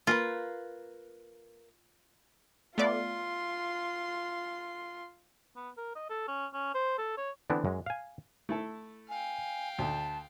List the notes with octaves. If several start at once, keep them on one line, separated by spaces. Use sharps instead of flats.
A#3 F4 A#4 B4
A3 B3 F4 D5 C6
B3
A#4
D#5
A4
C#4
C#4
C5
A4
C#5
D3 E3 B3 C4 D4 E4
F#2 G#3
F5 G#5
A3 E4 A4
F5 G5 G#5
D2 A5